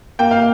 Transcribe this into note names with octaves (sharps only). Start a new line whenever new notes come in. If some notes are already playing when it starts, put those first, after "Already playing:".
A#3 G5
F5